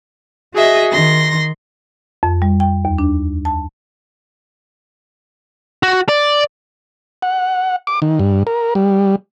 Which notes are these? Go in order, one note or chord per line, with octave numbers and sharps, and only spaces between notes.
F#4 G#4 D#5 E5
D#3 C6 A#6
F2
G3
G5
D#2
D4
A5
F#4
D5
F#5
D6
D#3
G2
A#4
G3